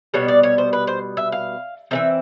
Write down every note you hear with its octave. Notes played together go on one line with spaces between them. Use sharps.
B2 G3 B3 C#5
D5
C#5
C5
B4
C5
E5
F5
E3 G3 C4 E5